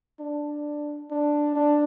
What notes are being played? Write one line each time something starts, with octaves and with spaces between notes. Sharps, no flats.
D4
D4
D4